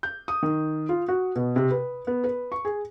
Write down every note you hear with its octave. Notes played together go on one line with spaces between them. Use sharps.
G6
D#6
D#3
F4
F#4
B2
C3
B4
B3
B4
C#6
G#4